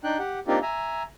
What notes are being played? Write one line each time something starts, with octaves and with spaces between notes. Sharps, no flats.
D4 D#4 G5 F#6
G4 F#5
A#3 C4 D4 D#4 F4 G4
E5 G#5 A#5